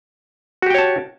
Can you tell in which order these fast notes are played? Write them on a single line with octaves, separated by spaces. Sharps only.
F#4 G4 G5 C#5 A5